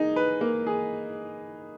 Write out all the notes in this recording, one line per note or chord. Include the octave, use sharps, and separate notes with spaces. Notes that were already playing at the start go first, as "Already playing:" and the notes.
Already playing: A#3 D#4 G#4
B4
A#3
G#4